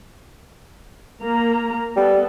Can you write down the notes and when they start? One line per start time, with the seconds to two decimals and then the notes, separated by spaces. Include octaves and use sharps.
1.22 A#3 A#5
1.96 G3 B3 A4